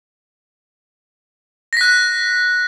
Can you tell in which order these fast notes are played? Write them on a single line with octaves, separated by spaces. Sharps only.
A#6 B6 F#6